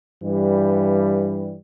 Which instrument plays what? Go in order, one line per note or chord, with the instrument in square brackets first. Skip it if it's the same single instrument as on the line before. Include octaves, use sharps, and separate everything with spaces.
[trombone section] G2 E3 G3